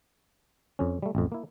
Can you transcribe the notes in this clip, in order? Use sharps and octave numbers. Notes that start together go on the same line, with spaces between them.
F2 C#4
G3 A3
A1 F2
A#3 E4